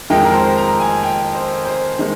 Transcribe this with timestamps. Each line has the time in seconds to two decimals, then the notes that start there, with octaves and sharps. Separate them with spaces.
0.10 F2 D#3 G#3 G5
0.24 A#4
0.34 C5
0.57 A#5
0.80 G#5
1.03 G5
1.35 C5
1.65 C5
1.99 D#3 G#3